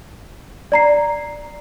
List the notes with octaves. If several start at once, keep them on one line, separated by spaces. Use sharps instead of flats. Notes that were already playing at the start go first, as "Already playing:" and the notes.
D5 A#5 C7